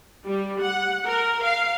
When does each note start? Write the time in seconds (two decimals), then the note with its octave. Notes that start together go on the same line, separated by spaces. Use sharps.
0.25 G3
0.62 F#5
1.06 A#4
1.44 F5